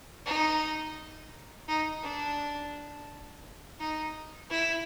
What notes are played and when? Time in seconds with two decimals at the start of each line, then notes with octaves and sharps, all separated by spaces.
0.26 D#4
1.68 D#4
2.03 D4
3.79 D#4
4.50 E4